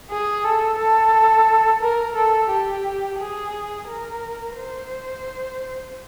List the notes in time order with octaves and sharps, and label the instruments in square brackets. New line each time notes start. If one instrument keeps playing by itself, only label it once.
[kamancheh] G#4
A4
A4
A#4
A4
G4
G#4
A#4
C5